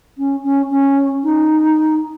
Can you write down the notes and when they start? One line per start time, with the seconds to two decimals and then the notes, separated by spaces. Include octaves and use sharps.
0.17 C#4
0.43 C#4
0.71 C#4
1.23 D#4